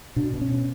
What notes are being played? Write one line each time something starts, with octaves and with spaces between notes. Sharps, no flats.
B2 D4
B2
C#4